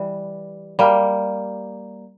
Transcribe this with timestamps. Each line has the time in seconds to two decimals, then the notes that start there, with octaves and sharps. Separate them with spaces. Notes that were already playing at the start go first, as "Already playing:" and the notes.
Already playing: E3 G3
0.79 G3 A#3